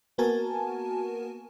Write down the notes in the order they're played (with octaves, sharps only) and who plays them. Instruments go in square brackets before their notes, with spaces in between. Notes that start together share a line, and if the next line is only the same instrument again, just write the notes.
[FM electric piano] A#3 B3 F#4 A#4 G#5 A5